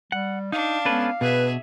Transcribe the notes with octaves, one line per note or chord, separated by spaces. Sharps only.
G3 F#5
D4 D#4 F5
G#3 B3 C#4 A4 B4
B2 G#4 B4 E5